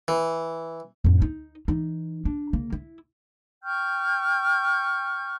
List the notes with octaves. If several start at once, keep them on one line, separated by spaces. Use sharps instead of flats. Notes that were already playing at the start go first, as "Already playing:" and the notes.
E3
F2 A2
D#4
E3 D#4
D4
C#3 A#3
E4
G5 C#6 F6 G6